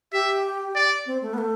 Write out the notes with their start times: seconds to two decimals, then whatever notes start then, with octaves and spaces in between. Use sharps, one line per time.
0.12 G4 E5
0.75 D5
1.06 C4
1.22 A3
1.34 B3
1.38 A3